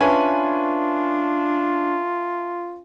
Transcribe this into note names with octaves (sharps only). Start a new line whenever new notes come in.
C#4 D4 F4 B4 E5 G#5 A5 C#6